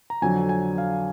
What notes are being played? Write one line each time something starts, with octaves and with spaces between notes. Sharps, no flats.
A#5
F2 D3 F#3 G#5
G#5
F5